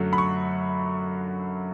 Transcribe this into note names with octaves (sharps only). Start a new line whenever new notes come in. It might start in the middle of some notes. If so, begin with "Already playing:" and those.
Already playing: F#2 D3 F#3 A3
B5
C#6